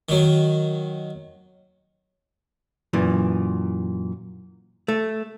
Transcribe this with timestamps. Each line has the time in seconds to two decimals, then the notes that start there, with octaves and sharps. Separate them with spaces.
0.09 D#3 F#3
2.93 F#2 A#2 E3
4.88 A3